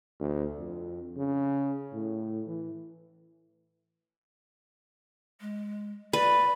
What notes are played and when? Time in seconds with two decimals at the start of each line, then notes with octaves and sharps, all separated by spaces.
0.20 D2
0.59 F2
1.17 C#3
1.94 A2
2.47 E3
5.41 G#3
6.13 B4 D5